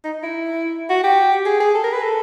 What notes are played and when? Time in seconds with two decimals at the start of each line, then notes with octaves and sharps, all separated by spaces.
0.04 D#4
0.23 E4
0.90 F#4
1.04 G4
1.46 G#4
1.60 G#4
1.75 A4
1.84 A#4
1.93 B4
2.03 A4